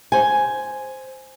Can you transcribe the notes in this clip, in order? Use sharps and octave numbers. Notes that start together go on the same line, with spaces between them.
C5 G#5